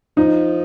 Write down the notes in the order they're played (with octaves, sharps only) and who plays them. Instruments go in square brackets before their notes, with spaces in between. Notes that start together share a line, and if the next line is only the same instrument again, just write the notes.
[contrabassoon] F3 [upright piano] D#4